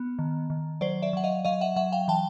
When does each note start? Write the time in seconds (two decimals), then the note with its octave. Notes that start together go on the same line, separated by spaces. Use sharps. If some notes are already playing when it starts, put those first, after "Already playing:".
Already playing: B3
0.19 D#3
0.50 D#3
0.81 F#3 C5 D5
1.02 D5 E5
1.13 F#3 F#5
1.24 D#5 F5
1.45 F#3 D#5 F5
1.61 E5 F#5
1.76 F#3 E5 F#5
1.92 F5 G5
2.08 E3 G5 A5